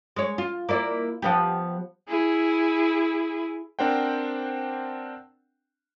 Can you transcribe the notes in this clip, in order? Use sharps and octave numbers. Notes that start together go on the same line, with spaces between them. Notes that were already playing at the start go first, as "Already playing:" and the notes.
G#3 C#5
F4
A#3 E4 D5
F3 B3 G4
E4 G#4
C4 D4 A#4 C5 F#5 G5